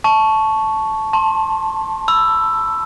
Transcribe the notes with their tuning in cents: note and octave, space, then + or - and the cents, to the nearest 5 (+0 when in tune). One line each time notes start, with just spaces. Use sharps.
A5 -10 C#6 +0
A5 +5 C6 +30
B5 +0 E6 +10